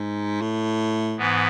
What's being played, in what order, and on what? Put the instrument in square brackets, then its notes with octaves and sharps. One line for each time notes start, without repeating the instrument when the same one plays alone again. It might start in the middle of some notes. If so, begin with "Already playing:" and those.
Already playing: [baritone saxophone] G#2
A2
[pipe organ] G#2 E3 B3